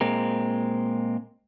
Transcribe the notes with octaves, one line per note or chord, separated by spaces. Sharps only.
A#2 G#3 C4 A#4